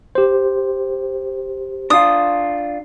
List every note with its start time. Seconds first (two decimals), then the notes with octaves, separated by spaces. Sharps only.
0.15 G4 C5
1.90 D4 F4 D#6